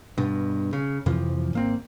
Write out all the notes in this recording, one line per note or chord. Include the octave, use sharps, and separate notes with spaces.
G2 B2
C#3
F2 C3 E3 F3
G#1 A#3 C4